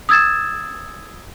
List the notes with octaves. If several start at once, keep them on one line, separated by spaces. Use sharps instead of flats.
D#6 E6 G#6 A6 E7